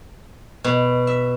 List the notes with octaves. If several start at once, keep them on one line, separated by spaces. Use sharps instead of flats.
B2
E5